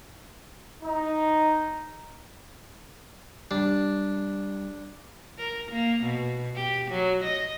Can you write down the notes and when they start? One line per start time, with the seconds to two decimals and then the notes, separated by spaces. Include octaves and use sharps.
0.84 D#4
3.51 G3 D4
5.39 A#4
5.71 A#3
6.03 B2
6.56 G4
6.91 F#3
7.24 D#5